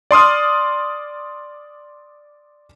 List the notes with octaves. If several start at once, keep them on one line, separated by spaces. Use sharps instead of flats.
D5 C6 D#6 F6